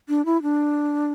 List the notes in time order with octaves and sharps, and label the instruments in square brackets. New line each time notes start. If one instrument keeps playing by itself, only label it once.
[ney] D4
E4
D4